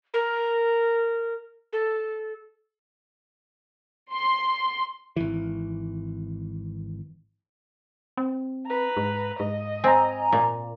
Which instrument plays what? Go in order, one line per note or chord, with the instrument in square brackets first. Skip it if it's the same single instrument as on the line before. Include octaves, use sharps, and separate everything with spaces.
[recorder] A#4
A4
[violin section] C6
[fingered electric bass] G#1 E3
[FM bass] C4
[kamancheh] B4 A#5
[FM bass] G#2
[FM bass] G#2 [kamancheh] D#5
[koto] C4 [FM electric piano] G#5 A#5
[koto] A#2